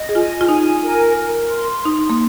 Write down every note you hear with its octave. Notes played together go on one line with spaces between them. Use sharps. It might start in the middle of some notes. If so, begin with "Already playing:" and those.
Already playing: D#5
G#4
F4 G#5
F4
D#4 G#5
A#4
A#4
C6
D#4 C6
A#3